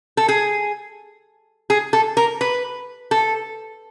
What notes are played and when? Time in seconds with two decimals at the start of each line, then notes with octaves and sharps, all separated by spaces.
0.17 A4
0.28 G#4
1.70 G#4
1.93 A4
2.17 A#4
2.41 B4
3.11 A4